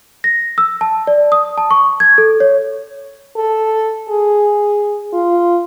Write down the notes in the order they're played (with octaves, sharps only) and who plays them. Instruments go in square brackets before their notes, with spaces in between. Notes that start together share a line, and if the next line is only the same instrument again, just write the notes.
[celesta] A#6
E6
A5
D5
D#6
A5
C#6
G#6
A4
C#5
[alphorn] A4
G#4
F4